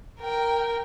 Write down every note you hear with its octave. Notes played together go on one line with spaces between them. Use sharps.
A#4 G5